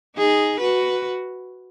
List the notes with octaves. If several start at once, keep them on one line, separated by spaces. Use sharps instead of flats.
D#4 G#4
F#4 B4